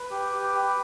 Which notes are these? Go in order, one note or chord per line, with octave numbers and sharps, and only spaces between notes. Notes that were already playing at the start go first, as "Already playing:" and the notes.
Already playing: B4
G4
G4
G4